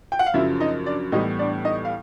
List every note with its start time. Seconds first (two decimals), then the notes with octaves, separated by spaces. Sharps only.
0.12 G5
0.19 F#5
0.26 F5
0.34 F#2 C#3 F3 E4 E5
0.60 D#4 D#5
0.86 D4 D5
1.12 A2 E3 G3 B3 D#4 D#5
1.39 D4 D5
1.65 D#4 D#5
1.85 F5